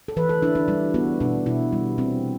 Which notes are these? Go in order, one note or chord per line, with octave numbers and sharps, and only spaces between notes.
A4
E3 B4
A4
D4 E4
D4
G3 E4
B3 F#4
B2 D4
B2 E4
G3
C4